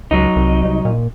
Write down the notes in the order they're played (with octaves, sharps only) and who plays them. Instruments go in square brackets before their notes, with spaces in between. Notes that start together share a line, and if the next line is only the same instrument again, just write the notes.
[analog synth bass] C#2 [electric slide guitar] F#3 D#4
[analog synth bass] C2
C2
A#2